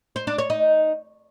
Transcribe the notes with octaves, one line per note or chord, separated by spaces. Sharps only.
C5
D4
C#5
D#4